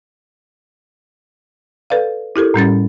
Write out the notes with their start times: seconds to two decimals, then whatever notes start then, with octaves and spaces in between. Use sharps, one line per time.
1.90 A4 B4 D5 F5
2.36 E4 G4 A4 A#4
2.54 A2 G3 C#4 A6